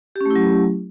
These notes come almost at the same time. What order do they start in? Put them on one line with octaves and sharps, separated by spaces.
G4 C#4 A3 E4 F#3